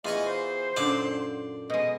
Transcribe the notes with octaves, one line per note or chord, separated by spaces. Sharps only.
E2 F4 D#5 G#5 C#6
C5
F#2 A#2 D3 D5 A5
B2 G#3 D#5